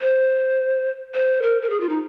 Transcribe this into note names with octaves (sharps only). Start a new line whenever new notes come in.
C5
C5
A#4
A#4
G#4
F4
D#4